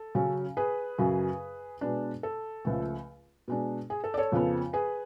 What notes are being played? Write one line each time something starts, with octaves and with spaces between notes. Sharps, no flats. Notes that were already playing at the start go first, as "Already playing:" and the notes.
Already playing: A4
C#3 F#3 C#4
G#4 B4
F#2 C#3 F#3
B2 G#3 B3 D4
A4
C#2 C#3 F3 A3
B2 G#3 D4
G#4
A4
D5
A4 C#5
F2 C#3 F3 B3
G#4 B4